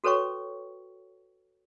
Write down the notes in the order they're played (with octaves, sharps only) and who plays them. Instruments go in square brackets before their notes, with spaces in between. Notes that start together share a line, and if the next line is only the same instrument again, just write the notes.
[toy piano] F#4 A4 B4 C#5 G5 C#6